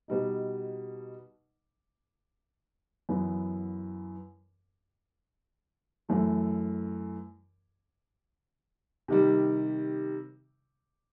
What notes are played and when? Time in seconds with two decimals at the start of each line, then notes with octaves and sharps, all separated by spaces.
0.08 B2 G3 D#4
3.09 F#2 E3 B3
6.09 F#2 E3 A3
9.08 C3 D#3 G3